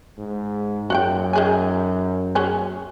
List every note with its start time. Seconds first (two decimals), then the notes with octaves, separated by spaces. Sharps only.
0.18 G#2
0.90 F#2 F#4 F#5 G5
1.33 D#3 G#4 G#5
2.35 F#3 C#4 G#4